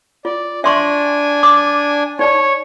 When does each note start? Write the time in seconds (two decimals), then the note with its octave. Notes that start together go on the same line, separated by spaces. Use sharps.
0.25 F4 D5
0.64 D4 E5 G#5 C6 C#6
1.43 D6
2.19 D#4 C#5 D5 A5